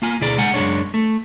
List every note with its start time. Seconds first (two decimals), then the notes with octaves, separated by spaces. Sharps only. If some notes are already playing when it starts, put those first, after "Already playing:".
0.02 A#3 F4 G#5
0.20 D2 B2 E4 G#4 D5
0.37 C#2 G#3 F#5 G#5
0.54 F#2 C#3 F#3 G#3 D4 C#5
0.94 A3